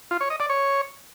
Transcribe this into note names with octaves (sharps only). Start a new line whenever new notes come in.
F4
C#5
D#5
D5
C#5